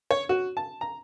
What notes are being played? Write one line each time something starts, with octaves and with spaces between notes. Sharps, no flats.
C#5
F#4
A5
A#5